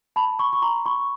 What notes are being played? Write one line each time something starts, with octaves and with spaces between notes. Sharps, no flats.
A5 B5
B5 C#6
C#6
A#5 C6
B5 C#6